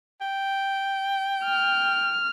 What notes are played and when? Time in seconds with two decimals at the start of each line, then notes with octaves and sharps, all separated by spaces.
0.21 G5
1.45 F6